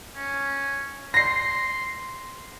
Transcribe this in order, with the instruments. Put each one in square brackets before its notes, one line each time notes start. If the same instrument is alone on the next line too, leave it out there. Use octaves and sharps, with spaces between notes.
[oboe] C#4
[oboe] C6 [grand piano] A#6 C7